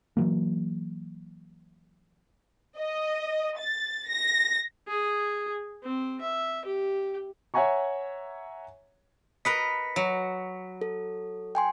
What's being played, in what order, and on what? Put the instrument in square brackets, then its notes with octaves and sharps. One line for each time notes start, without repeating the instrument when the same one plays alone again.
[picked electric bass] E3 F#3 A#3
[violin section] D#5
A6
A#6
[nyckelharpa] G#4
C4
E5
G4
[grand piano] C#5 E5 F#5 G#5 A#5 C#6
[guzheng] A#4 B4 D#5 [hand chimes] B6 C#7
[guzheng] F#3
[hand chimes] A4
G5 G#5 C6